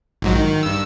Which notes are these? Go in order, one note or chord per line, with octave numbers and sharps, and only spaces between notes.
A#1 G#2 F#3
D#3
G2 E6